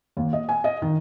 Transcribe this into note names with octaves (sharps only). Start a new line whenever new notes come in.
D#2
D#5
G#5
D#5
D#3